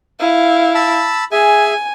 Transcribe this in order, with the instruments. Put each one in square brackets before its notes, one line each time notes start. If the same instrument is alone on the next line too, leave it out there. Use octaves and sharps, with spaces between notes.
[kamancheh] E4 F5
[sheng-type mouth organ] A5 B5 E6
[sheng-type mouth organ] G#4 E5 [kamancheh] G#5